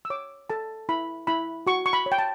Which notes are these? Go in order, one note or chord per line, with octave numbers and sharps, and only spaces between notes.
E6
C#5 D6
A4 A5
E4 B5
E4 B5
F#4 C#6
C#6
B5
C#5
G5
A5